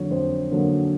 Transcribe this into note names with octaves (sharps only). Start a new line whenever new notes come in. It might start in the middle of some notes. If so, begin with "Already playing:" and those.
Already playing: F2 D3 F#3 A#3 C#5
F2 C5
D3 F#3 A#3